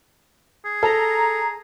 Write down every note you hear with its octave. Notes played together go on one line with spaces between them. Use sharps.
G#4
A4 A#5